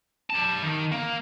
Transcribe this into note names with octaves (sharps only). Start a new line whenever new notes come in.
G4 A5
D#3
A#3